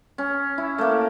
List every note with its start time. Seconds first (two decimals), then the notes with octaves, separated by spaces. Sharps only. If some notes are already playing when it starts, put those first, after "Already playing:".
0.18 C#4
0.58 E4
0.78 A3 A#3